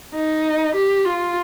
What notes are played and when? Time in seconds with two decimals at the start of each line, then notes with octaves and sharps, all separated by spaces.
0.15 D#4
0.75 G4
1.05 F4